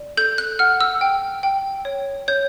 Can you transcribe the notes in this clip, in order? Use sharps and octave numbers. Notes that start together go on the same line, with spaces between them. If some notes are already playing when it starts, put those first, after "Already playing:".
Already playing: D5
A4 G6
F#6
F#5 F6
E6
G5
G5
C#5
C#5 G6